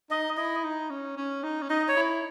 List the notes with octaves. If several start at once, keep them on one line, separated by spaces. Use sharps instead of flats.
D#4 D#5
E4 D#5
D#4
C#4
C#4
D#4
C#4
D#4 D#5
C#5
E4